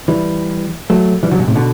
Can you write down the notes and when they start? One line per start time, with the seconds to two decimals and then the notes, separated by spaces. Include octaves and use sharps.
0.08 E3 G3
0.90 F#3 A3
1.23 E3 G3
1.31 D3 F#3
1.39 G2 B2
1.47 A2 C3
1.55 B2 D3